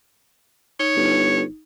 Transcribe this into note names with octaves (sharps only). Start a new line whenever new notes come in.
D#4 C#5
G1